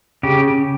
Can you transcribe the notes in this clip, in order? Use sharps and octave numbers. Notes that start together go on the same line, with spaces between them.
C#3 G4